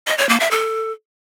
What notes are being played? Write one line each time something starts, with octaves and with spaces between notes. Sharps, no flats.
D#5
C#5
A#3
E5
A4